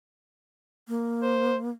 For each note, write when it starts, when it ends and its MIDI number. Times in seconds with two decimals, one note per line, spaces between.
0.88 1.70 58
1.23 1.56 72